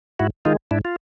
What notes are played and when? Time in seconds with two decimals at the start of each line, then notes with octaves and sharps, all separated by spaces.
0.19 G#2 E4 F#4
0.45 D#3 G#3 D#4 F4
0.71 G#2 D4 E4
0.85 F4